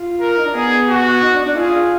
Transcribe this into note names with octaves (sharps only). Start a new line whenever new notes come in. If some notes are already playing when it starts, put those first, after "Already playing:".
Already playing: F4
A#4
D#4
D4
B3 G#4
F#4
D#4
D4
D4
F4 G#4